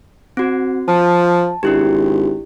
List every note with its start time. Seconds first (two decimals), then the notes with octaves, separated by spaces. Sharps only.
0.37 C4 F#4
0.88 F3 A5
1.63 G#1 D4 E4 G4